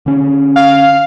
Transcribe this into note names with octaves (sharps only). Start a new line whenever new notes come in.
D3 C#4
F5